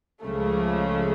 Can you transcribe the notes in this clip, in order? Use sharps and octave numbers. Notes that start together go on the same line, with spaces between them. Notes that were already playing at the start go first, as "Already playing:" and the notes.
C#2 C#3 F3 A3